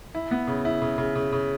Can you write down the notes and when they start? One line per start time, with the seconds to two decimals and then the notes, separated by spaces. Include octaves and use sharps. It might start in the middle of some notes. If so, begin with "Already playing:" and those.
0.15 E4
0.31 B3
0.47 C#3
0.65 E4
0.82 C#3
0.98 C#3
1.15 C#3
1.33 C#3